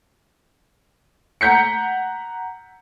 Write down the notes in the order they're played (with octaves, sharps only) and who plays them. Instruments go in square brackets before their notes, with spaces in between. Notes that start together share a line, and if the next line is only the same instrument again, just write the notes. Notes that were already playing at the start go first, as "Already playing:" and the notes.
[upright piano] F#5 A#5 G6 B6 C#7